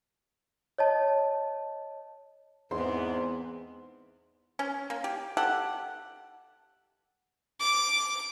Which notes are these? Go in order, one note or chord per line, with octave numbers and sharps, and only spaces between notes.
C#5 D#5 A5
E2 G#2 B3 C4 C6
C#4
A#3
G4
G4 A4 F#5
D6